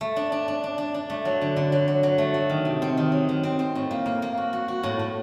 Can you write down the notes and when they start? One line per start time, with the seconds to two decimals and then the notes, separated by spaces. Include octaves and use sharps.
0.01 A3
0.16 D4
0.32 D4
0.48 D4
0.64 D4
0.78 D4
0.94 D4
1.10 A3
1.25 F#3
1.42 D3
1.56 D3
1.72 F#3
1.88 F#3
2.03 F#3
2.18 A3
2.34 F#3
2.49 D#3
2.65 C3
2.82 C4
2.97 D#3
3.12 F#3
3.29 D#3
3.43 C4
3.59 C4
3.75 A2
3.91 A#3
4.06 A#3
4.22 A#3
4.37 F#4
4.53 F#4
4.68 F#4
4.83 A2
4.99 A2